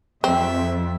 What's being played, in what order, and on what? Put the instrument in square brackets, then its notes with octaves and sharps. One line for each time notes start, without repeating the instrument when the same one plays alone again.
[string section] F2 [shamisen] C4 [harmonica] E5